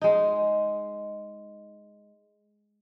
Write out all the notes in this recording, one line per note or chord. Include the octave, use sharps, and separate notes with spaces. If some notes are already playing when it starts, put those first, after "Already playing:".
G#3 D#4